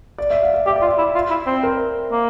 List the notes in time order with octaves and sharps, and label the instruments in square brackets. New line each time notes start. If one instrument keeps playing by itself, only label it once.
[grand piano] D5
E5
F5
F5
[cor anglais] G4 [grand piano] E5
[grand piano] D5
[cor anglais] F4
[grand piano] E5
[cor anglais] E4
F4
E4
C4
[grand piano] A#4
[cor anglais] A#3